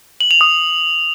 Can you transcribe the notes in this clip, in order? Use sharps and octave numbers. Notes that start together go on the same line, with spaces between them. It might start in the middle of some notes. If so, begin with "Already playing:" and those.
F#7
F7
D#6